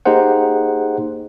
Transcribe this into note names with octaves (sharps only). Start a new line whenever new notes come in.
A#3 D#4 G4 G#4 C5 F#5